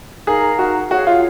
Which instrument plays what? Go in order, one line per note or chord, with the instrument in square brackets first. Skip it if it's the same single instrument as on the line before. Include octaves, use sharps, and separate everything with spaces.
[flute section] D#4 A#4 F5 A#5 [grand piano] G#4
[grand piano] F#4
[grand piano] F#4 [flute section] G#4 C#5 F5
[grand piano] F4